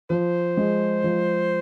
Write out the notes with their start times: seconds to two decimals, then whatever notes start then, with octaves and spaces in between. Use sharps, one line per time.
0.10 F3 C5
0.57 G#3
1.04 F3